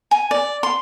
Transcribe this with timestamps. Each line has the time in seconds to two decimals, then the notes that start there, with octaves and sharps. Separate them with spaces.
0.11 G#5
0.31 D5
0.63 C6